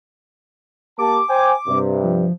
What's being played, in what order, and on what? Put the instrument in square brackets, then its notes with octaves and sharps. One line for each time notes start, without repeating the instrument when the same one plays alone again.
[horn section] A#3 G4 A5 [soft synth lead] D6
[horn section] C5 G5 G#5
G2 C3
[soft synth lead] F3